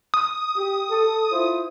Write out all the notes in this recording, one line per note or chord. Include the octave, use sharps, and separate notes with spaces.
D#6
G4
A4
E4 F4 C5